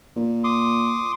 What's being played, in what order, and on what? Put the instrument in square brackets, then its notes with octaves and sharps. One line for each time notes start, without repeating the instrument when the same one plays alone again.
[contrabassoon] A#2
[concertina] C6 D6 D#6